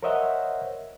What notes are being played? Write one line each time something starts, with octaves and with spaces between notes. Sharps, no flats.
A#4 C5 C#5 D#5 E5 F#5